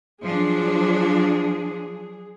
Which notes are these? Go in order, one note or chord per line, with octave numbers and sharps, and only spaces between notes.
F3 F#3 D4 G#4